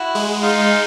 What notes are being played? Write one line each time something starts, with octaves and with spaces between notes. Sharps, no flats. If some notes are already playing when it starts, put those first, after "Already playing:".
Already playing: E4 F#4
G#3
D#4 F4